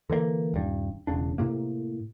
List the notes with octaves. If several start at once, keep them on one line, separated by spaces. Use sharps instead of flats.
D3 E3 G#3 A#3
D#1 G2
E1 C#3 D4
A2 C3 A#3